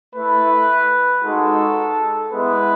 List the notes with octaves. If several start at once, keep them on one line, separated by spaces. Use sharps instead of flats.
A3 E4 B4
G#3 D#4 F#4 A4
G#3 B3 E4 B4